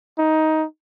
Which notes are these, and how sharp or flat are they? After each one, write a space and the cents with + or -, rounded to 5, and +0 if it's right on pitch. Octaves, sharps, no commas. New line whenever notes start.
D#4 +15